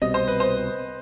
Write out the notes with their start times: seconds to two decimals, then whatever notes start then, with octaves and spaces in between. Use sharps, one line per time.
0.02 C2 B2 G3 C4 D#5
0.14 C5
0.28 B4
0.40 C5